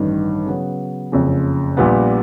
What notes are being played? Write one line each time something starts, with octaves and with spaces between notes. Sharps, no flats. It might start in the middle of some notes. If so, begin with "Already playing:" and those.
Already playing: A1 G2 D#3
C#3 F#3 B3
F#1 F2 C#3
A#1 A#2 G3 B3